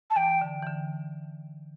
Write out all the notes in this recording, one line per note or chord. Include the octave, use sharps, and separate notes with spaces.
A5
E3 G5
D3
E3
D3